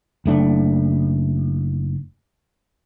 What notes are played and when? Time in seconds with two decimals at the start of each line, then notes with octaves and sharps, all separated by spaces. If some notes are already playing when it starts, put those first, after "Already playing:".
0.26 F#1 A3 D4